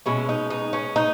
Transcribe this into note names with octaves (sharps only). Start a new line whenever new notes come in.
B2 G#3 C#4 E4
D#4
D#4
C#4
D#4